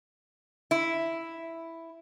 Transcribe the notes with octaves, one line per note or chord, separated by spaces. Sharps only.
E4